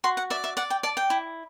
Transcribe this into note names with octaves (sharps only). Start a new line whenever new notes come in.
F#4 C6
F#5
D5 E5
E5
D5 F#5
G5
D5 A5
G5
E4